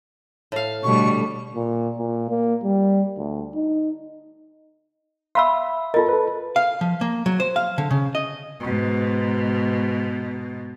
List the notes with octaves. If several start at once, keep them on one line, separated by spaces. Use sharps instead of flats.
A2 F5
B2 D3 G3 A3 C#6
A#2
A#2
A#3
G3
D2
D#4
E5 F5 B5 C6 E6
F4 A4 A#4 D#5
A4 B4
F5
F3
A#3
F#3
C5
F5
D3
C#3
D#5
G#2 B2